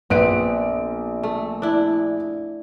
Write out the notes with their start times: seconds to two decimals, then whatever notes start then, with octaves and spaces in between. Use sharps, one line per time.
0.10 A#1 B3 C4 B4 D7
1.23 A3
1.62 D4 E4